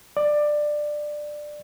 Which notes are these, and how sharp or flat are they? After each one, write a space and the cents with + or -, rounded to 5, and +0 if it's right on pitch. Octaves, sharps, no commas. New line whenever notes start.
D5 +15